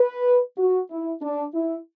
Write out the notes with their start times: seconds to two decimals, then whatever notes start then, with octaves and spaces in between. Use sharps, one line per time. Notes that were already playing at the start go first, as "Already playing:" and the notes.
Already playing: B4
0.57 F#4
0.90 E4
1.21 D4
1.53 E4